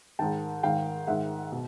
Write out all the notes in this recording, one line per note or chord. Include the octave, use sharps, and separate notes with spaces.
G#2 D#3 G5 A5
G#2 D#3 F5 G5
G#2 D#3 E5 F#5
B2